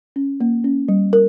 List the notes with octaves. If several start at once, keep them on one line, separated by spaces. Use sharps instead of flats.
C#4
A#3
C#4
G3
A#4